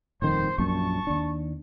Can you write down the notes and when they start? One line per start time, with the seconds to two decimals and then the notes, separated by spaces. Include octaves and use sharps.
0.22 D#1 F2 D#3 C5
0.58 A#1 F#2 A#2 A5 C#6
1.07 D#2 D4